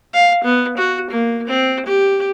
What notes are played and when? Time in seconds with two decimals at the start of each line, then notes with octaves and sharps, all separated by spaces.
0.13 F5
0.43 B3
0.77 F#4
1.10 A#3
1.47 C4
1.86 G4